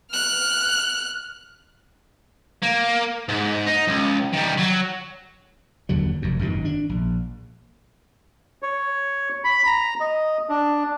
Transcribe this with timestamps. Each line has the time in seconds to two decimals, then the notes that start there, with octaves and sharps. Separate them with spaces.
0.12 F6 F#6
2.62 A#3
3.29 G#2
3.66 D#4
3.87 C#2
4.33 D#3 G3
4.58 F#3
5.89 D#2 D3 F#3
6.22 F1 F#2
6.39 G#1 F#2 B2 D#3
6.65 D4
6.89 A#1
8.62 C#5
9.44 B5
9.66 A#5
10.00 D#5
10.49 D4